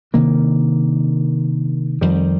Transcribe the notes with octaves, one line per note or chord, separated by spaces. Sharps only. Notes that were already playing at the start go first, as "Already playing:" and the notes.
C3 D#3 A#3 D4
F2 D#3 G3